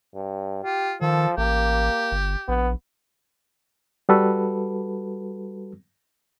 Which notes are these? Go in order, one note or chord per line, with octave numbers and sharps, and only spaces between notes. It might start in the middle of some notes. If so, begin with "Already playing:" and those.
G2
F4 G4
D#3 F3 A4
A1 A#3 G4
G1
A#1 B3
G3 F#4 A4 B4